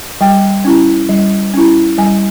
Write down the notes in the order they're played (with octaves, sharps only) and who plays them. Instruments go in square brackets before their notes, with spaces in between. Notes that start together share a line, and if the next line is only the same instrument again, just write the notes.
[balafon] G3 G5
C#4 E4
G3
C#4 E4
G3 G#5